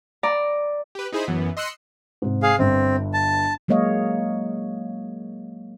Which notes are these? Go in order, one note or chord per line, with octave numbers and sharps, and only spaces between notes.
D5 A#5
G4 B4
D#4 E4 G#4 C5 B5
F#2 E3 B3
D#5 C6 E6 F#6 C#7
G#2 C3
G#4 F5
G1 G2 C4
A5
F#3 G#3 A#3 C#5 D#5 F5